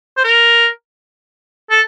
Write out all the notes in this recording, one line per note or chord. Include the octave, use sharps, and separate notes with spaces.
C5
A#4
A4